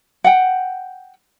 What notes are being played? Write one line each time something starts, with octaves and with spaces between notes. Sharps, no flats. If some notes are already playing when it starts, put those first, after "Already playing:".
F#5 G5